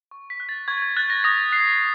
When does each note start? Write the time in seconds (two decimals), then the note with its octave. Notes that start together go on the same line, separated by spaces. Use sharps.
0.11 C#6
0.30 B6
0.40 F#6
0.49 A6
0.68 C#6 G#6
0.82 G#6
0.96 F#6 A6
1.10 A#6
1.24 D#6 A#6
1.52 F#6 C7